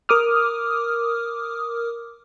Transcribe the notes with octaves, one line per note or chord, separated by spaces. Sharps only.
A#4 D6 D#6 F6